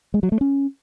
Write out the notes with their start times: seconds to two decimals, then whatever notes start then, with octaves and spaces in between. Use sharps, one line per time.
0.14 G#3
0.23 F#3
0.32 A3
0.41 C#4